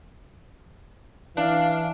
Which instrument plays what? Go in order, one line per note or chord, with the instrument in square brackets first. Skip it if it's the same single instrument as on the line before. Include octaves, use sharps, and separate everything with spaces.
[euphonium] E3 [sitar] D4 [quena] F5